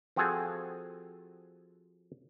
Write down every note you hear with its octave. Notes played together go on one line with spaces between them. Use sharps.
F3 C4 F#4 G#4 A4 G#5